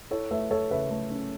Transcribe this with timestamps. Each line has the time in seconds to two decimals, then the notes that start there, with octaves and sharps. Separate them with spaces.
0.11 E4 A4 C#5
0.31 A3 B4 E5
0.51 A3 A4 C#5
0.71 C#3 B4 E5
0.91 A3
1.10 C#4